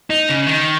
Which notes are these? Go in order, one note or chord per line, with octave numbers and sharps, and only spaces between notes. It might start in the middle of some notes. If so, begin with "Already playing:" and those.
D#4
C#3
D#3